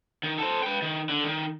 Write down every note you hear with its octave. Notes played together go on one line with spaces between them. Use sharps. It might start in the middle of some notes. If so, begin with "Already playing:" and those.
D#3
A4 C5
B4 G5
D#3
D3
D#3